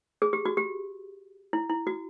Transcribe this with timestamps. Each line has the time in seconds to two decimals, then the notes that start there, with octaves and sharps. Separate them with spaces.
0.22 G#4
0.33 G4
0.45 F#4
0.57 G4
1.53 E4
1.69 E4
1.87 F#4